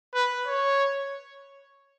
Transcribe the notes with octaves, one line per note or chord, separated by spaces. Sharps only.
B4
C#5